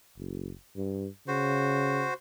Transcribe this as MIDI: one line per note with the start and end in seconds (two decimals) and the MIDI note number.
0.17 0.53 30
0.76 1.08 43
1.28 2.08 49
1.28 2.14 66
1.28 2.14 72